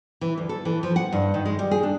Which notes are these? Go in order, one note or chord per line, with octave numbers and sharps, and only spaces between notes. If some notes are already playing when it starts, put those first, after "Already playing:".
E3
D2
A4
E3
F3
F#5
G2
D#3
G#3
G3
G#4
D4